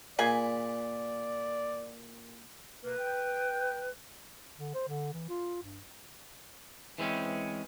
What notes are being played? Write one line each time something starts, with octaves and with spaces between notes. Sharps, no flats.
A#2 G#4 D5 G#5 B5
B2 A#3 B4
G5
D3
C5
D3
E3
F4
G2
E3 G#3 C4 C#4